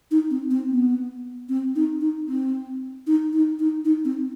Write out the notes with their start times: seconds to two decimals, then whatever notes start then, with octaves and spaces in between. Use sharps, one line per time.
0.11 D#4
0.31 C4
0.51 C4
0.70 B3
1.49 C4
1.76 D#4
2.01 D#4
2.28 C4
3.07 D#4
3.33 D#4
3.60 D#4
3.85 D#4
4.05 C4